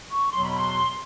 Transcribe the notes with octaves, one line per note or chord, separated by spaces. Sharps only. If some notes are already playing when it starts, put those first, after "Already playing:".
C#6
E2 B2 F#3 C6
B5
C6